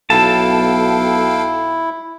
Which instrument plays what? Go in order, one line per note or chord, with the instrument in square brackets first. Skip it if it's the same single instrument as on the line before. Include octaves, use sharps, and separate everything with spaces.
[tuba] B1 [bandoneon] E4 [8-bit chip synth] A4 F5 G5 [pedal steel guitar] A5